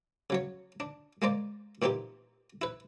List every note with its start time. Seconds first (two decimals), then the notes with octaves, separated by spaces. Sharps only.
0.30 C#3 F#3 C#5
0.80 D4
1.22 G#3 A#3 C5 D5
1.82 A#2 E3 C4 D#4 G4
2.62 E4 B4